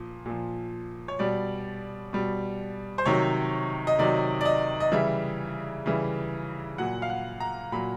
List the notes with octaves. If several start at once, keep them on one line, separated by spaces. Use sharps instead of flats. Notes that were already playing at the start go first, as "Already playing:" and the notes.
Already playing: A#2 F3
A#2 F3
C#5
B2 G3 D5
B2 G3
C5
C3 D#3 F#3 C#5
D#5
C3 D#3 F#3 D5
D5
D#5
D#5
C#3 E3 G3 E5
C#3 E3 G3
A#2 F#3 F#5
F5
F#5
A#5
A#2 F#3 B5